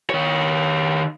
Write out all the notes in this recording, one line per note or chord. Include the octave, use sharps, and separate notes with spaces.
D#3 C#5